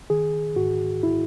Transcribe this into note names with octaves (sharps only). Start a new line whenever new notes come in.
D#3 G#4
G#2 F#4
E4